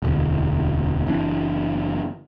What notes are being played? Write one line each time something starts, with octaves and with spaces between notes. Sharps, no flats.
E1 D2
F#1 E3 D4